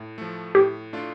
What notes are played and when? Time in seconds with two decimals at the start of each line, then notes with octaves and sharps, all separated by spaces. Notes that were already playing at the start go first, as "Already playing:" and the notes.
Already playing: A2
0.18 F3 A3
0.55 A2 G4
0.93 A3 D4 F4